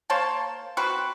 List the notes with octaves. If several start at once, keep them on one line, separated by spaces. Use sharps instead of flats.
A#3 C5 C#5 A5
C4 F#4 B4